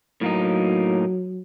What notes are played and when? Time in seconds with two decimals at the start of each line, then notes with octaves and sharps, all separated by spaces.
0.21 A2 F#3 A#3 D#4